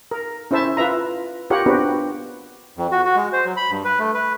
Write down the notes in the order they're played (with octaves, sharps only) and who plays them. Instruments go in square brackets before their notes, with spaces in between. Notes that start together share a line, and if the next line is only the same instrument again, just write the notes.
[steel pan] A#4
C#4 E4 C5 E5 A5
F4 B4 E5 A#5
F4 G4 A#4 C#5 F#5
B3 C4 D4 F#4 G4 B4
[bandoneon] F2
F#4
F#4
G#3
C5
F#3
B5
G2
B4
A3
B4